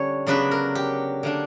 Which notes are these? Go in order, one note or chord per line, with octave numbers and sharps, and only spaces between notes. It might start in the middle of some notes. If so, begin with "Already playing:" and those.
Already playing: D3 G3 C#4 C#5
C#3 F#3 B3 D4 B4
A#4
G4
D3 A#3 D4